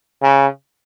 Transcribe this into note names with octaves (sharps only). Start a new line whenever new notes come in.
C#3